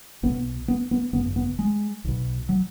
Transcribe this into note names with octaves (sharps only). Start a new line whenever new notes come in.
B1 B2 B3
B3
B3
G#1 F#2 C#3 B3
B3
G#3
B1 B2
F#3